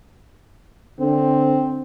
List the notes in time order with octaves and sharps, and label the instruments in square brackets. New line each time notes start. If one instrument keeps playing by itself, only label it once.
[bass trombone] D3 [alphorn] C4